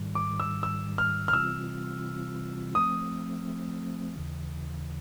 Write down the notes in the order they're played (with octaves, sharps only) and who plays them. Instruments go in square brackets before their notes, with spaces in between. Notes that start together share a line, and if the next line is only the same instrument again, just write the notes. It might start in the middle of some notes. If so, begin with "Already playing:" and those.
Already playing: [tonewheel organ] G#2 D#3 G3
[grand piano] D6
E6
E6
F6
F6
[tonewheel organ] C3 E3 G3 C4 F4 [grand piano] E6
[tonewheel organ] F3 A3 C4 [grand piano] D#6
[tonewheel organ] D#2 C#3 E3